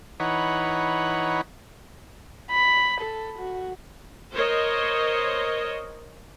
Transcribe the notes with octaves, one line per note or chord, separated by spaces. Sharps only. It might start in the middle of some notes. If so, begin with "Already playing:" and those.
E3 D#4 C#5 F#5 B5
B5
A4
F#4
A#4 C5 C#5 D#5